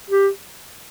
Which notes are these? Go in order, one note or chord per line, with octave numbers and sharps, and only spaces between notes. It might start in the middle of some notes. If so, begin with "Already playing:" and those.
G4